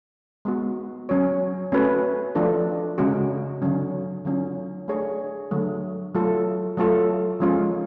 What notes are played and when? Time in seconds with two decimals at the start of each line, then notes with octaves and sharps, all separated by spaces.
0.45 G#3 B3 F#4
1.09 F#3 C#4 F#4 C#5
1.72 A3 C#4 F#4 B4
2.35 F3 A3 D4 F4 A4
2.98 C#3 G#3 C#4 F#4
3.62 D3 F#3 C#4
4.25 D3 F#3 C#4 F4
4.88 A3 D4 G#4 C#5
5.51 D3 F#3 A3
6.15 F#3 A3 F4 A4
6.77 F#3 A3 F4 A4
7.40 F3 G#3 C#4 F4